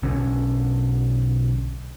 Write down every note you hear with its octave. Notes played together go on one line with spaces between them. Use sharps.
B1 D3 C#4